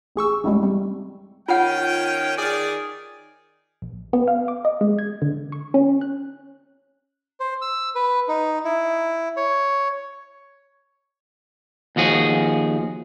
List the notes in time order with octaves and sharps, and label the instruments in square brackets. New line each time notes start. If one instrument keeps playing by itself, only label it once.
[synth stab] A1 G#4 C#6 E6
A1 F#2 A2 G3 G#3
C3 G3
[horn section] D#3 C#4 G5 [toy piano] F4 F#5
[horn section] D#3 G#4 D5
[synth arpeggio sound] A#1
B3
F5
D6
D#5
G#3
G#6
D3
C#6
C#4
F#6
[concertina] C5
E6
B4
D#4
E4
C#5
[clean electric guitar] D#2 F3 F#4 G#4